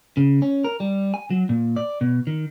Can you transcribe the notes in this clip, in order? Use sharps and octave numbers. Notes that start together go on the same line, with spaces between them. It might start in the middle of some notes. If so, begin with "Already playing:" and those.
C#3
C#4
A#4
G3
G#5
F#3
A#2
D5
B2
D#3